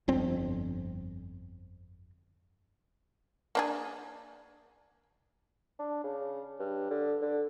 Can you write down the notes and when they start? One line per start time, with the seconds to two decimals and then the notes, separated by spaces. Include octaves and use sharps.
0.08 G1 F2 C4
3.55 A#3 D4 G#4
5.79 D4
6.04 C#3
6.59 G2
6.90 D3
7.22 D3